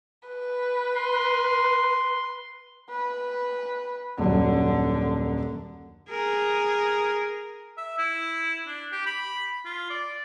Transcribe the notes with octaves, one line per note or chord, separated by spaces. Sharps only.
B4
C6
B4
D#1 F#2 D3
G#4 A#4
E5
E4
D4
G4
B5
F4
D5